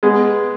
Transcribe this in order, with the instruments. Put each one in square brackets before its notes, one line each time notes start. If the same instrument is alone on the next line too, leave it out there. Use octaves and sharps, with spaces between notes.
[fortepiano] G#3 B3